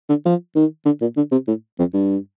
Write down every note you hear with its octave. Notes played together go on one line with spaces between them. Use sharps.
D3
F3
D#3
D3
A#2
D3
C3
A2
F2
G2